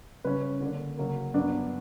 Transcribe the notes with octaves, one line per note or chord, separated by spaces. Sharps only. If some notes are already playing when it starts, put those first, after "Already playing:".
C#3 G3 C#4 B4
D3 A#3 D4
C#3 F#3 A#3
G2 F#3 B3 D4